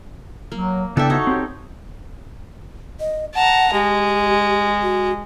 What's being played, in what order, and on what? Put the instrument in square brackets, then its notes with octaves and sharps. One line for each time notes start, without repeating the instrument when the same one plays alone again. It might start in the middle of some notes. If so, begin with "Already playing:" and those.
[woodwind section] F#3 [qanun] A#3
[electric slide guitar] C#3 B3 E4 [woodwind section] D4 D5 G5 [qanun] A4 E5
[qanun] D#4 [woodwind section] F#4 C#5
[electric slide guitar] C4 G4
[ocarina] D#5
[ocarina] F#5 [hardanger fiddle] A5 A#5
[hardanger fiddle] G#3 [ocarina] G4
[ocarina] F#4